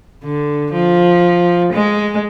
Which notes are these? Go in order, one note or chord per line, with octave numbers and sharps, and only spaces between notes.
D3
F3
G#3